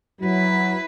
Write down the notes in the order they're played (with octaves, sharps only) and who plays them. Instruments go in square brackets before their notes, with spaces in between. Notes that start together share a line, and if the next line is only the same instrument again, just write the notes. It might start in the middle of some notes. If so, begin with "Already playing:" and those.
[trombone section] F#3 [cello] E4 B4